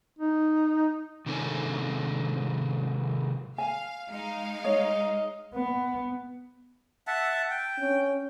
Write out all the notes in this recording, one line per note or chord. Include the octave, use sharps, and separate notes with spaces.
D#4
C3 D#3 G#3 C#4 A4
F5 G#5
G#3 D#4 F5
C#5 D#5
B3
E5 F#5 A5
G5
C#4